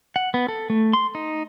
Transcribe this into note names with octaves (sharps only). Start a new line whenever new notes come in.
F#5
B3
A4
A3
C6
D#4